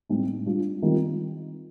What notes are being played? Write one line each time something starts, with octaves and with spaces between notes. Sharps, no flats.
A2 G3 C4 D#4
G3 D4 F4
D#3 G3 C4 F4